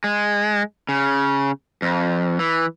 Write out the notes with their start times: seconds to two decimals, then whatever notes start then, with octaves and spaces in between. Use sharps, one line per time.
0.04 G#3
0.89 C#3
1.82 F2
2.39 E3